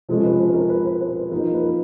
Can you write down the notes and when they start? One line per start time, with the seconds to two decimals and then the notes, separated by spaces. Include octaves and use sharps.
0.09 C3 F3 G#3 C#4 A4
0.24 B4
0.39 C5
0.47 B4
0.54 A#4
0.70 B4
0.85 C5
1.01 C5
1.16 B4
1.32 F3 A#3 D#4 A#4
1.54 B4
1.62 A#4